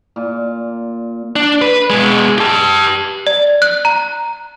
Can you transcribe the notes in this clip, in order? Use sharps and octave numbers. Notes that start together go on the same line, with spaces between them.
A#2
D4
B4
B2 G#3
G4 A5
D5
F#6
A#5